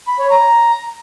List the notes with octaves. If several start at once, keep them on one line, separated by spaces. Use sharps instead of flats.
B5
C#5
A#5